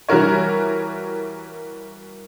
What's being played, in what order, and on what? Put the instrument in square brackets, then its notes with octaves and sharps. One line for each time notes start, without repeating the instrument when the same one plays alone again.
[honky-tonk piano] E3 G3 F#4 A#4 C#5